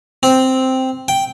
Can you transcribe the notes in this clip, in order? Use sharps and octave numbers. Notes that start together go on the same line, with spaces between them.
C4
G5